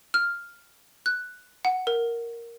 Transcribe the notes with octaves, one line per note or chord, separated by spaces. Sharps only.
F6
F#6
F#5
A#4